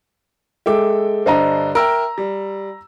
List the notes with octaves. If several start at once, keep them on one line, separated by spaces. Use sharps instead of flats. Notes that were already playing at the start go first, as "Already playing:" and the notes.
G#3 A4 E5 G5 D6
G2 D3 C5 D#5 A#5
A#4 E5 G5 A#5 E6
G3